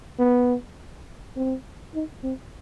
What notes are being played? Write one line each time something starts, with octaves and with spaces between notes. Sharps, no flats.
B3
C4
D#4
C4